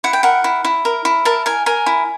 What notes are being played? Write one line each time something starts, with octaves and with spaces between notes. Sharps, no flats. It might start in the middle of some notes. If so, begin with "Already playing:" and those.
E4 F#5
G5
A#4 F#5
E4
E4
A#4
E4
A#4 A5
A#4 G#5
A#4 G#5
E4